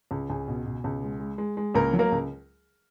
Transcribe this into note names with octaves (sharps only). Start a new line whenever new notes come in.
C#2
C#2 G#4
B2
B2
C#2
G#3
G#3
G#3
G#3
C#2 A#3 A#4
F#3
A#3 A#4
C#2